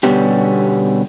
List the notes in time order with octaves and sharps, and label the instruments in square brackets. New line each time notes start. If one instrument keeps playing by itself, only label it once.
[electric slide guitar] B2 D3 G3 B3 C#4 G4